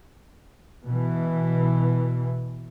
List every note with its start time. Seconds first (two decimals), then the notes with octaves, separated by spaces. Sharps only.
0.85 B2 E3